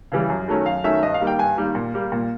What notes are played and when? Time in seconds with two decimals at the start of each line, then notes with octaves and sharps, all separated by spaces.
0.12 C#3 E3 G3
0.30 F#2
0.48 D#3 F#3 A3 C#4
0.66 F#2 F5
0.84 D#3 F#3 A3 C#4 E5
1.03 G2 D#5
1.14 F5
1.21 D#3 G3 A#3
1.27 G5
1.39 G2 G#5
1.57 D#3 G3 A#3
1.75 A#2
1.94 G3 A#3
2.12 A#2